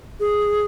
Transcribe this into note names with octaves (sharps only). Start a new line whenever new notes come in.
G#4